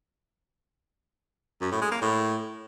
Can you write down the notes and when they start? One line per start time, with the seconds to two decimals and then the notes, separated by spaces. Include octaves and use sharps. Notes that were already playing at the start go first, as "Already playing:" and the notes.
1.61 F#2
1.71 A2
1.81 G#3
1.91 A#3
2.01 A2